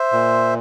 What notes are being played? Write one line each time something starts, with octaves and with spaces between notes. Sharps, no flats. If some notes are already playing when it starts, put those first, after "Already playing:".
Already playing: C5 E5
A#2